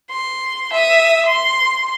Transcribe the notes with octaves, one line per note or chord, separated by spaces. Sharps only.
C6
E5 D#6
C6